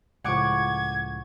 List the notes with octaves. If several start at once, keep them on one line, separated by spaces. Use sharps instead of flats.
C#2 A2 F3 F#5 C#6 D6 G#6